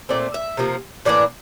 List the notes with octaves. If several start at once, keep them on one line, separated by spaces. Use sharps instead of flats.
A#2 A3 C4 D5
E5
C3 F3 A#3
A2 E3 A#3 D4 D5